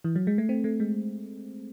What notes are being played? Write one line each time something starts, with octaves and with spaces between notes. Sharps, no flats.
E3
F#3
G#3
A3
C4
A3
G#3